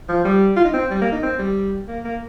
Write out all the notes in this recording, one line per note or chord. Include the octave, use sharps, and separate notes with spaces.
F3
G3
F4
D#4
C4
G3
A#3
D#4
C4
G3
A#3
A#3